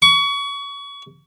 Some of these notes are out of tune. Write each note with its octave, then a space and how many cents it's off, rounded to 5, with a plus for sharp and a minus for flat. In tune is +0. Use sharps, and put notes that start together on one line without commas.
C#6 +30